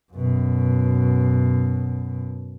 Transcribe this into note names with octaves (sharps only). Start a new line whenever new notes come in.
F#2 B2